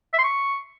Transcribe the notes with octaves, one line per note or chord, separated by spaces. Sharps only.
E5
C6
C#6